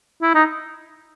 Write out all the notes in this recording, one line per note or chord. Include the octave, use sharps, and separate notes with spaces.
E4
D#4